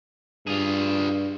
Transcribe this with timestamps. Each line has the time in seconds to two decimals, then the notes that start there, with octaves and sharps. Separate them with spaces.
0.47 G2 F4 G#4